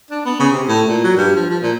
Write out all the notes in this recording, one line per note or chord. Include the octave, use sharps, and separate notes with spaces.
D4
B3
C#3
C3
A2
A#2
F#3
G2
F3
F3
A#2